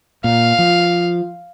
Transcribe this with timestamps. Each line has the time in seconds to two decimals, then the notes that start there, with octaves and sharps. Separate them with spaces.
0.24 A#2 F5
0.59 F3